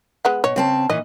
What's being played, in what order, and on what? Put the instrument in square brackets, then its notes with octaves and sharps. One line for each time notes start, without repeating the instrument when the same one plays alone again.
[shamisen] G#3 B3 F#5
[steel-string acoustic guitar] B2 [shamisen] C#5
[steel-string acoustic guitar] C#3 C4 A5
[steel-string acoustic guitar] A#2 E3 C#4 [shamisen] D#5